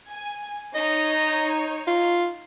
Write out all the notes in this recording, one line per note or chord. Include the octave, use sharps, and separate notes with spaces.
G#5
D#4 C#5 D#5
F4